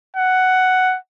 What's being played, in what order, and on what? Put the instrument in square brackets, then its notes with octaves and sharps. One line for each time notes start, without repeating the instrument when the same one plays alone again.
[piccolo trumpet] F#5